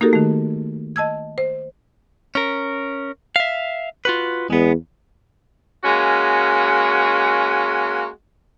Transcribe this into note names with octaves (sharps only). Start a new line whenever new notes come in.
A#3 D#4 F#4 G4 A4 A#4
D#3 A3
D#5 A5 E6 G#6
C5
C#4 A#4
E5 F5
F4 F#4 B4
E2 G#3 B3
G#3 A#3 C#4 F#4